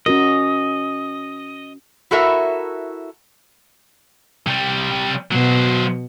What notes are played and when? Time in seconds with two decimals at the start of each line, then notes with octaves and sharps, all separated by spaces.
0.06 C#4 F#4 A#4 D#5
2.11 E4 F#4 A4 A#4 E5
4.47 C3 G3
5.31 B2 F#3 C5